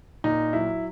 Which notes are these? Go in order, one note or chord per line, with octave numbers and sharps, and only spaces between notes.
A#2 D#4
F#3 E4